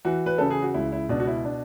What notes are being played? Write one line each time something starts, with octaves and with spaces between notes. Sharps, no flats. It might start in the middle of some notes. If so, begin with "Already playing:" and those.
E3 F#4
B4
C#3 A4
G#4
F#4
C#2 E4
E4
B2 D4
F#4
E4
D4